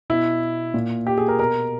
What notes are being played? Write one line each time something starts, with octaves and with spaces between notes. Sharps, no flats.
B2 E4
A#2
G4
G#4
A#4
B2 A#4